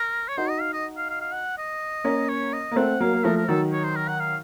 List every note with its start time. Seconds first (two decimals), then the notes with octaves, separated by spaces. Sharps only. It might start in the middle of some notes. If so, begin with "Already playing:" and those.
Already playing: A#4
0.28 C#5
0.37 D#4 F#4 C5
0.49 D#5
0.61 F5
0.73 D#5
0.97 F5
1.09 F5
1.21 F5
1.33 F#5
1.58 D#5
2.04 A#3 C#4
2.28 C#5
2.53 D#5
2.71 A#3
2.76 A3 C4 F#5
3.00 F#3 A#3 F5
3.13 A#3
3.24 F3 A3 A#4
3.36 A#4
3.48 D#3 F#3 A4
3.72 C#5
3.84 C5
3.96 A#4
4.08 F#5
4.20 F5